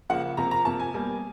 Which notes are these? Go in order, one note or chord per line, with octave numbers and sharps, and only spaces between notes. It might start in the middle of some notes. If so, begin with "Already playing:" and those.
C#3 F3 A#3 F#5
C3 F3 A#3 A#5
A#5
C3 F3 A#3 A5
G#5
B2 G3 A#3